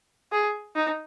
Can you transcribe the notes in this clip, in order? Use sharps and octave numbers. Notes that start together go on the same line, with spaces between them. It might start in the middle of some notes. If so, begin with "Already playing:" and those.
G#4
D#4